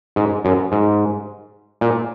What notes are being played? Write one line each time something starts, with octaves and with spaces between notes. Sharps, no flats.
G#2
F#2
G#2
A#2